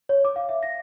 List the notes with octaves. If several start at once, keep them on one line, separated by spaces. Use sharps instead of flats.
C#5
D6
F5
E5
A#6